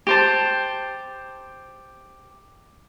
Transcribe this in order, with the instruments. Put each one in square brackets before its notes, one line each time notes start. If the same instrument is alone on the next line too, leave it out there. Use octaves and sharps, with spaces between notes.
[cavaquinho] G4 C5 A5